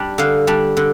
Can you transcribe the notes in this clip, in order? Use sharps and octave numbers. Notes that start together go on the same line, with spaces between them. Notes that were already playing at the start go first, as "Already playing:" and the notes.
Already playing: G3 D4
D3 F5
G3 D4
D3